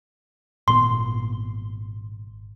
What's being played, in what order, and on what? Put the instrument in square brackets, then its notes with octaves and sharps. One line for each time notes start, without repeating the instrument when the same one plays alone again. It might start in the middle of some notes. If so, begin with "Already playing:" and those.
[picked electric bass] G#1 A#2 B3 [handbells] C6